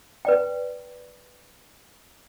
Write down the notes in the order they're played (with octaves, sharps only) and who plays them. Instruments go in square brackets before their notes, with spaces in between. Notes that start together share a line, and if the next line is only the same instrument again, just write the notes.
[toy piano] B4 D5 G5